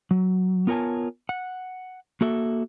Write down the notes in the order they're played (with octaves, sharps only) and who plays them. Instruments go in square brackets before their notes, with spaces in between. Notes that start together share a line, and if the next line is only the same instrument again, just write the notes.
[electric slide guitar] F#3
B3 F4 A#4 C#5 G#5 A5
F#5
A#3 F#4 A4 E5